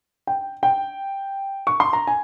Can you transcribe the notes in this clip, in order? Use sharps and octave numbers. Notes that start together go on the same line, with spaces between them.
G5
G5
C#6
C6
A#5
G#5